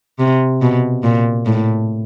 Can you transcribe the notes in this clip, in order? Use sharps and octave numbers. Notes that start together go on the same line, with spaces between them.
C3
B2
A#2
A2